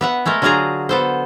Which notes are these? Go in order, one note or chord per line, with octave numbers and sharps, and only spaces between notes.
B3 E5 F#5
G#3 A3 A4 A#4
D3 F#3 F4 F#4 G#4 A#5
B3 A4 C5